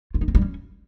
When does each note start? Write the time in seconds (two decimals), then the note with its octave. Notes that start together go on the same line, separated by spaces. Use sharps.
0.14 F4
0.21 D#4
0.28 C4
0.35 G3
0.41 C#4